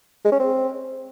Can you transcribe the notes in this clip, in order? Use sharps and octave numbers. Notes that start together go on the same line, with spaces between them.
G#3
C#4
C4